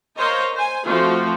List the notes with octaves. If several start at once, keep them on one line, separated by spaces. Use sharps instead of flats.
A#4 C5 C#5 D#5 F5 A#5
C5 G#5
F3 A3 C4 F4 F#4